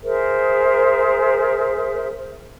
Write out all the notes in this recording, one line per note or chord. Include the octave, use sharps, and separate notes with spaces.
G#4 A#4 C5 E5